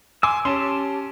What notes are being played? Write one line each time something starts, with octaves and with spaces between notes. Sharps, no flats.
G#5 C6 D6 E6
C#4 G4 A5 C6